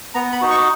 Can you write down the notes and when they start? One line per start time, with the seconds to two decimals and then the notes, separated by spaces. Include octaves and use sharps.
0.14 B3 A#5
0.33 B5
0.41 D#4 F#4
0.51 C#6